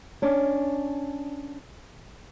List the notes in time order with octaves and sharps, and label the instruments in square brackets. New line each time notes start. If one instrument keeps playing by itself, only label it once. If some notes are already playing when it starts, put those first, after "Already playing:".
[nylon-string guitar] C#4 D4